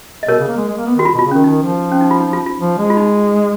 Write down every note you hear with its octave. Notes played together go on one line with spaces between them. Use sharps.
D#5
B2 A#4 C#5
C#3
A#3
G#3
G#3
A#3
B3
D#3 F#4
F4
B2
F4
C#3
D#3 C#4
D#3 D#4
F3
C#4
D#4
F4
D#4
F4
F4
F3
G#3
F4
D#4